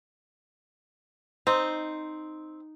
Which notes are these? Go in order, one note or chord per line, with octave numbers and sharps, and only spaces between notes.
C4 D#4